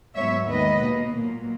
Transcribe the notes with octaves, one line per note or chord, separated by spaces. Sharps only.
G#2 F#3 B3 C#5 E5
D#2 D#3 G#3 B3 B4 D#5
B2 A#3
A#2 F#3 A#3